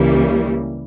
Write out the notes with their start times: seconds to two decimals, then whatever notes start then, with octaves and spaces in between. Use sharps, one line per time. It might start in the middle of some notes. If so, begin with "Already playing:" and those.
Already playing: C#2 C#3 E3 G3 A#3